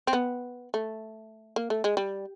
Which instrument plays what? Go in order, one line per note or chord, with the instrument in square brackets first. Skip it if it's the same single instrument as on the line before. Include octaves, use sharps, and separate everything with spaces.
[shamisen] C4
B3
A3
A#3
A3
G#3
G3